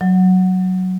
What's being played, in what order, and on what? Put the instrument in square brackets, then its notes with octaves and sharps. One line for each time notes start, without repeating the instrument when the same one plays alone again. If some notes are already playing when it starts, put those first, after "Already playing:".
[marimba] F#3